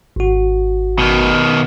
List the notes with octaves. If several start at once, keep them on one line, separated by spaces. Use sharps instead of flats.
G#1 F#4
B2 D#3